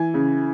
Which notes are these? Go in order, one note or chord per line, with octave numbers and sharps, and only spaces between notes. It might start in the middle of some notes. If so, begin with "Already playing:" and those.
Already playing: E3 G#5
C#3